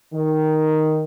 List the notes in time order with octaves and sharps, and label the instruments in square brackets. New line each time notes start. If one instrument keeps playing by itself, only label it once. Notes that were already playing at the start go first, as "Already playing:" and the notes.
[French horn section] D#3